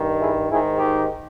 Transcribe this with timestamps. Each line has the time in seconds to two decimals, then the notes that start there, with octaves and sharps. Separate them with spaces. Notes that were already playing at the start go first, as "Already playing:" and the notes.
Already playing: G2 D#3
0.20 E4 G#4
0.50 G#2 D#3 E4 G#4
0.78 D#4 G4